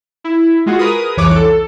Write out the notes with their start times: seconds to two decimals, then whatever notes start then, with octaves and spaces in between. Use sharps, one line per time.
0.24 E4
0.66 G#3 F4 F#4 G#4
0.79 G#4 A#4 B4 D#6
1.17 C2 F2 E3 C#5 D6 F#6
1.36 A4